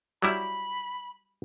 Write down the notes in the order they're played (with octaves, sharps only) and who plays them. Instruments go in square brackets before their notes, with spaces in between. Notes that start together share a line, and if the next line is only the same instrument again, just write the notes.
[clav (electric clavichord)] F#3 G3 E4 [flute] B5